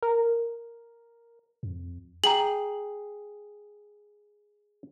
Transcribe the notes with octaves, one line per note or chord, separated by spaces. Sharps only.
A#4
F2
G#4 G5 A#5 F#7